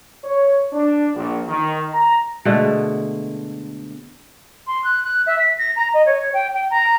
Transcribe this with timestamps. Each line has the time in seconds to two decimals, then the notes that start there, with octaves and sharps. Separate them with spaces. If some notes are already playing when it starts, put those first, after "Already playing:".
0.23 C#5
0.73 D4
1.14 A#1
1.48 D#3
1.93 A#5
2.45 B2 D3 G#3 A3
4.67 C6
4.84 F#6
5.04 F#6
5.27 E5
5.39 B6
5.58 A#6
5.76 A#5
5.94 D#5
6.06 C#5
6.34 G5
6.53 G5
6.71 A#5